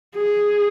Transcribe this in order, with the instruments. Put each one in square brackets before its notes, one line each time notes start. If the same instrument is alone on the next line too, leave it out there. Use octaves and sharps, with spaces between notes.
[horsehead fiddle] G#4